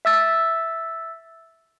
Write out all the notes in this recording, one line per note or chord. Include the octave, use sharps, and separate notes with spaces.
E5 E6 A6